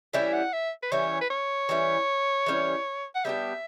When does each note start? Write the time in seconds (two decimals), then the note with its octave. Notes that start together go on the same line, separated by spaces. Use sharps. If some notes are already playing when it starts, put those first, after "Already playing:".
0.13 E3 G3 C#4 E4 E5
0.33 F#5
0.53 E5
0.83 B4
0.92 E3 G3 C#4 E4 C#5
1.21 B4
1.30 C#5
1.69 E3 G3 C#4 E4
2.46 E3 G3 C#4 E4
3.15 F#5
3.25 G3 B3 D4 G4 E5